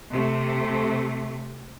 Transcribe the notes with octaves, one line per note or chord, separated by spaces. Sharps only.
C3 A3